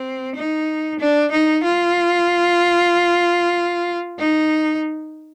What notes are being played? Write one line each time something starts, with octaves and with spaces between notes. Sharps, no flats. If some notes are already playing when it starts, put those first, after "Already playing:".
Already playing: C4
D#4
D4
D#4
F4
D#4